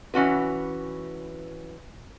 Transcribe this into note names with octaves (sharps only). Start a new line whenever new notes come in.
E3 C#4 F#4 B4